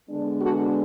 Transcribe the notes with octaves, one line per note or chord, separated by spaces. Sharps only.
D3 G#3 B3 D4
F#4 A4